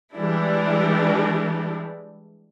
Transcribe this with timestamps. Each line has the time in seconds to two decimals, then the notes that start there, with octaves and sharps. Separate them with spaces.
0.13 E3 G3 G#3 D4 E4